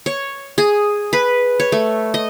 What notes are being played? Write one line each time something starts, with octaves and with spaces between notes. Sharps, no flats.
C#5
G#4
B4
C#5
A3
D#5